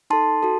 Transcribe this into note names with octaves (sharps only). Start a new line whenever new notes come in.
D#4 A4 A5 C6
F#4 A4